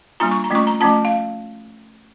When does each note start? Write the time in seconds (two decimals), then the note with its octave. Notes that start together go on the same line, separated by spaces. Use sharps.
0.20 G3 A#3 D4 F4 A#5
0.31 C#6
0.44 A#5
0.50 F3 A3 C#4 F4 C#6
0.67 A#5
0.80 F3 A3 C#4 F4 A5
1.05 F5